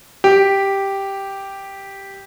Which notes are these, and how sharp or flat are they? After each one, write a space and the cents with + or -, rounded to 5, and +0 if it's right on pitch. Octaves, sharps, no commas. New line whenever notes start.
G4 +0